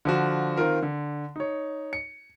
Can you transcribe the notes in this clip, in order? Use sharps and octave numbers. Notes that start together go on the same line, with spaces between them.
D3 F3 F#4
D#3 C4 F4 A#4
D3
D#4 C#5
C#7